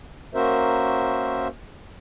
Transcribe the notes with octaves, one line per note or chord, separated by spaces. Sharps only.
A#3 C#4 F#4 A#4 C5 E5